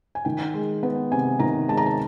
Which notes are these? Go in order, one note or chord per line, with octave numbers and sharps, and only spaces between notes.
G#5
D#3 G5
G#3
B3
C3 G#5
D#3 A#5
G#3 A5
A#5
A5